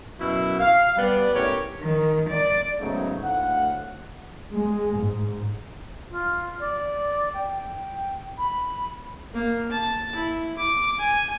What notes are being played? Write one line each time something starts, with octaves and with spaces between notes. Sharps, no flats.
F#2 B2 E4
F5
G3 B3 D5
A2 B3 C#4 G4 A#4 C#5
D#3
D5
G#2 C#3 F#3 A3 B3 D#4
D2 A2 F5 F#5
G#3
G#2
F4
D5
G5
B5
A#3
A5
E4
D6
G#5